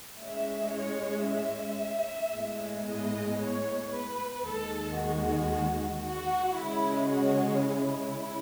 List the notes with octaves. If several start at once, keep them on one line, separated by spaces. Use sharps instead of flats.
A2 G#3 C#4 E5
C#5
E5
A2 G#3 B3
D#5
C#5
B4
D#2 D#3 G#3 A4
F#4
F#4
C#3 G#3 C#4 E4
F#4
E4